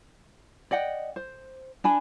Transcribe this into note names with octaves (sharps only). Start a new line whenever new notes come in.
D5 D#5 F#5 G5
C5
D4 G#5 B5